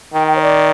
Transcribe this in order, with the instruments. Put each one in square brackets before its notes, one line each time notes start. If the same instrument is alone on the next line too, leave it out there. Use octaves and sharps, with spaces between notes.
[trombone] D#3 [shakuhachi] G5
[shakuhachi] G5
C#5
D5